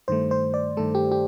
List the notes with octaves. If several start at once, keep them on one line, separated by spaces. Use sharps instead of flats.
G2 D#3 A3 C5
C5
D5
G2 D#3 A3 A4
G4
G4